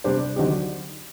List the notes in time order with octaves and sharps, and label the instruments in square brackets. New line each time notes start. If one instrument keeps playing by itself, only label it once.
[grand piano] C3 G3 D4 G4 C5
D3 F#3 C4 D#4 G4